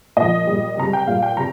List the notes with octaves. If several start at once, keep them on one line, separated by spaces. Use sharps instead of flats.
A#2 F3 D#5
A#2 G3
C3 G3 A#5
G5
A#2 G3 F5
G5
C3 A#5